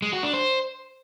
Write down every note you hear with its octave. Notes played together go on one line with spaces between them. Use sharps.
G#3
F#4
D4
C5